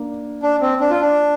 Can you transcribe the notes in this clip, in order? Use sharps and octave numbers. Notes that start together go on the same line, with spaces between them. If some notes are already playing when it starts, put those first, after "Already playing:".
Already playing: A#3 D4
D4
C4
D4
F4
D4